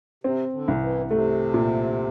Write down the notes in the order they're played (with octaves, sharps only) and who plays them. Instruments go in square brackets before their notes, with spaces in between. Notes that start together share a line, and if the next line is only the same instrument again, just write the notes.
[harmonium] C3 [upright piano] C4
[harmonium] D3
[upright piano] C2
[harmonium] E3
[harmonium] C3 [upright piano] A3
[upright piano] A#2